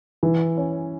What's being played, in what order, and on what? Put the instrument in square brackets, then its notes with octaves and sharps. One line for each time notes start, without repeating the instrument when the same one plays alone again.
[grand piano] E3
C#4